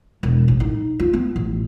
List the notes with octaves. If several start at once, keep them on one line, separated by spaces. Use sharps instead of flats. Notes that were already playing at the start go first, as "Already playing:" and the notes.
E1
A1
D#4
F4
B3
A1